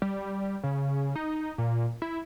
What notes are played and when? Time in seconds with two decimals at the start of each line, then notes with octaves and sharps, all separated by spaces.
0.02 G3
0.64 C#3
1.16 D#4
1.58 A#2
2.02 E4